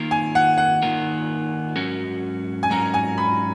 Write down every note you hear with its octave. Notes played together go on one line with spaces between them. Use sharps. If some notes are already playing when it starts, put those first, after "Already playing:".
Already playing: D#3 A#3 F4 A#4
G#5
F#5
F#5
D#3 A#3 F4 A#4
G#2 F#3 C#4 F#4 A#4
G#5
G#2 F#3 C#4 F#4 A#4 A#5
G#5
B5